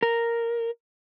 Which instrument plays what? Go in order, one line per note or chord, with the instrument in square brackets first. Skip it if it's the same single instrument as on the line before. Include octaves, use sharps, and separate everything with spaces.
[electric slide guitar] A#4